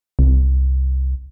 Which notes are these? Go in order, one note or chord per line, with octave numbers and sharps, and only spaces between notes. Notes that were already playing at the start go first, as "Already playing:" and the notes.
C2